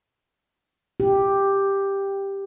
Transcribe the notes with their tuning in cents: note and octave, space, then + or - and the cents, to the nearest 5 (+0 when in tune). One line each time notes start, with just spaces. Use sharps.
G4 +5